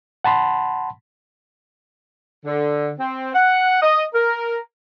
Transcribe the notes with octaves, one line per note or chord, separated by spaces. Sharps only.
F#5 A5 B5 C6
D3
C4
F#5
D#5
A#4